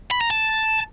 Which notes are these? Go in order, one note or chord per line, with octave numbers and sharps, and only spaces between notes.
B5
A#5
A5